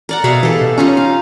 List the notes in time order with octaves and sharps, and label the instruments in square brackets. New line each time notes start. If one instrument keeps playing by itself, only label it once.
[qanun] A#4 D5 F#5
[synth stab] B2 [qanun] G#4 E5 F5
[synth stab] E3 [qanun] G4 A4
[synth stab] B2
[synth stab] C#4 [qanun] D#4 F4 A#5
[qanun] F5